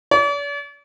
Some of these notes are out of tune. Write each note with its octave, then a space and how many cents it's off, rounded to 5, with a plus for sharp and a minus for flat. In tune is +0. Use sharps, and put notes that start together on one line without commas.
D5 -45